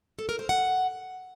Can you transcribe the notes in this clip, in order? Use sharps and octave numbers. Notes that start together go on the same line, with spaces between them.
A4
A#4
C5
F#5